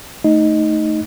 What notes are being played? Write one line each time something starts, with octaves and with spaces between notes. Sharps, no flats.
A3 D#4 D#5